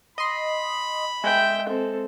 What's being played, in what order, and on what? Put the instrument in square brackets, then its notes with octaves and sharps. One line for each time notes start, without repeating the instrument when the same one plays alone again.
[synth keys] D#5 C6 [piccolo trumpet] B5
[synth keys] G#3 [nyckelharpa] E5 G5
[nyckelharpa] C4 A4